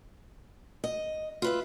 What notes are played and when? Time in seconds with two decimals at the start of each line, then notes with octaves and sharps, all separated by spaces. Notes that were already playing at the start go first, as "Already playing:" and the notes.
0.84 D#5
1.42 F4 B4 E5